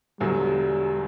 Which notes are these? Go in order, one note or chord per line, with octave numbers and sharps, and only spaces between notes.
E1 E2 D3 F#3 G3